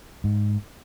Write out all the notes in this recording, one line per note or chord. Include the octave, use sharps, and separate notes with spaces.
G#2